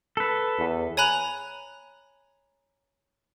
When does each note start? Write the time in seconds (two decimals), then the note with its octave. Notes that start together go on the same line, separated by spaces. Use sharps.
0.17 A4 B4
0.58 E2
0.97 C#5 G#5 A#5 B5 F#6 F7